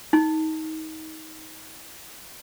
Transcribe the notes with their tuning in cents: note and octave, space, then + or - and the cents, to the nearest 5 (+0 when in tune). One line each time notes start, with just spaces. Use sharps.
D#4 +25